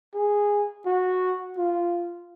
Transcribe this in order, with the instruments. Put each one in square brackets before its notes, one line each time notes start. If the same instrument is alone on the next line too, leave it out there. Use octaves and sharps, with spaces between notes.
[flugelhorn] G#4
F#4
F4